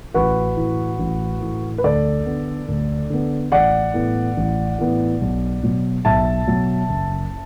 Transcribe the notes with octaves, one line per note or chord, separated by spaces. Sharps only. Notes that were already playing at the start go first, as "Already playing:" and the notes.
A1 F#4 B4
A2 E3
A1
A2 E3
B4
D2 A4 D5
D3 B3
D2
D3 B3
A1 D5 F#5
A2 E3 B3
A1
A2 E3 B3
B1
B2 F#3
B1 E5 A5
B2 F#3
F#1